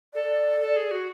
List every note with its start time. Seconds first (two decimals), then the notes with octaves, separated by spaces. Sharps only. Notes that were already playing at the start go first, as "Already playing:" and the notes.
0.14 A4 D5
0.60 A4
0.76 G#4
0.91 F#4